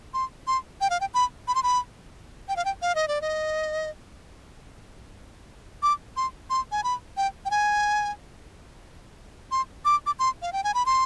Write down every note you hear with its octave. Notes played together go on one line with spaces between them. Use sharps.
C6
C6
G5
F5
G5
B5
B5
C6
B5
G5
F5
G5
F5
D#5
D5
D#5
D6
C6
C6
G#5
B5
G5
G5
G#5
C6
D6
D6
C6
F5
G5
G#5
B5
C6